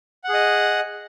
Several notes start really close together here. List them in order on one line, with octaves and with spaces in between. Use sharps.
F#5 G#4 D#5